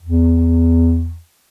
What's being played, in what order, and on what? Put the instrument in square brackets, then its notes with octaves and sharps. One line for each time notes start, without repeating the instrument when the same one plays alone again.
[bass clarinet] E2